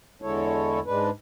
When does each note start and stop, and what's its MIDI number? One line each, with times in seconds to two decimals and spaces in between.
0.22 0.80 40
0.22 0.80 50
0.22 0.80 56
0.22 0.80 64
0.22 0.80 69
0.22 0.80 73
0.86 1.10 44
0.86 1.10 56
0.86 1.10 62
0.86 1.10 71